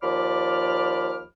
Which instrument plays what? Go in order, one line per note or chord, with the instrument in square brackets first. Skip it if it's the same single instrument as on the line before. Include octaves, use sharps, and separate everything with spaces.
[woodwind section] D#2 F3 D5 B5 D6 F6